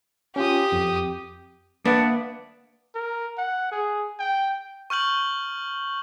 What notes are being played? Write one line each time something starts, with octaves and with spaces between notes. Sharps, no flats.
C#4 F4 G4 D#6
F2
A#3 B3 D4 E5 F#5
A#4
F#5
G#4
G5
C#6 F6 G6 F#7